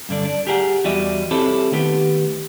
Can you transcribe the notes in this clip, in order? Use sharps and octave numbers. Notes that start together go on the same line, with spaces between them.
G2 D3 D4
D4
G4 G#4 A#4 F#5
E2 G3 F#4 G4 D#5 E5
C4 E4 G4 A4 C5 C#5
D#3 A3 B3 G4